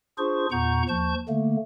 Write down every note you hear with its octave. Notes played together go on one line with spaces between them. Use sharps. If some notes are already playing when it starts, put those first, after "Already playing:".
D4 F4 G#4 C5 C#6
E2 A#2 F#5 A#5 C#6 G6
D#2 F3 A5 C#6 G6
D3 A3 A#3